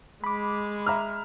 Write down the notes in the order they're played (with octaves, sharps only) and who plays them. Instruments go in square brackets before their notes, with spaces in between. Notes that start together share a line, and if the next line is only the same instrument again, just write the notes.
[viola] G#3 [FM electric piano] B5 D6
[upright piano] E5 A#5 F6